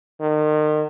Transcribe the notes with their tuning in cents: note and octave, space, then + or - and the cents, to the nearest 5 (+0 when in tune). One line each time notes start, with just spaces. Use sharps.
D#3 -35